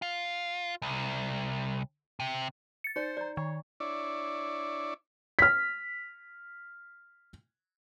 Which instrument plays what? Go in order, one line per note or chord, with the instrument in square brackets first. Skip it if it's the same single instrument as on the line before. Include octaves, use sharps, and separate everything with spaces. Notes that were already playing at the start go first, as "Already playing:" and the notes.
[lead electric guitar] F4
C2
C3
[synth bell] A6 C#7
[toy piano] D#4 D5 [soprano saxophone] C5
[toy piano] D5 A#5
[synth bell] D#3 [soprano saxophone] C#5
[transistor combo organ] D4 E4 C#5 D5
[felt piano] F6 B6